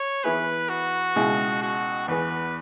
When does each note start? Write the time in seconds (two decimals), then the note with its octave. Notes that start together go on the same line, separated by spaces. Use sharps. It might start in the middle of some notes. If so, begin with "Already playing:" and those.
Already playing: C#5
0.24 E3 B3 E4 G#4 B4
0.69 F#4
1.16 C#2 B2 G#3 E4 G#4
1.62 F#4
2.08 E2 E3 B3 G#4 B4